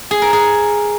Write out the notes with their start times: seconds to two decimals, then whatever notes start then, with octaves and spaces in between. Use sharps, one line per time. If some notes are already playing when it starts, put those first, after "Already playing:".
0.11 G#4
0.22 A#4
0.33 G#4